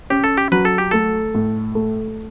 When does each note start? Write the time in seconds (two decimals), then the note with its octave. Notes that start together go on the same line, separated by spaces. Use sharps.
0.10 C#4 G4
0.24 A4
0.38 G4
0.52 F#3 B4
0.65 A4
0.78 G4
0.91 A3 A4
1.34 A2
1.75 A3